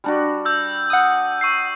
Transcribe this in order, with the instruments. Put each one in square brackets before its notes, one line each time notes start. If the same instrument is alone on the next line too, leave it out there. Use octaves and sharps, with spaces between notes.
[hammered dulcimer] G3 D4 F#4
[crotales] E6 G6
[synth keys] F#5 D#6
[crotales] C#6 E6 C7